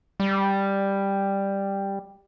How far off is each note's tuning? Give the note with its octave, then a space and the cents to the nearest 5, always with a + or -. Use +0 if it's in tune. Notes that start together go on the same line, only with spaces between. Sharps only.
G3 +5